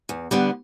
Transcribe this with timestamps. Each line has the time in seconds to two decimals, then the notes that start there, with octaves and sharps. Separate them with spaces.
0.09 E2
0.31 D3 G3 B3 D4